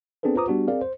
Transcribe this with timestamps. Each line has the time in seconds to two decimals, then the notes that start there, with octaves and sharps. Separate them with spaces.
0.23 B3 C4 D4 G#4 A4 B4
0.35 F4 B4 C5 A#5 D6 D#6
0.47 G3 B3 D4 F#4 G4
0.68 C4 G#4 A#4 D5 F5
0.81 C5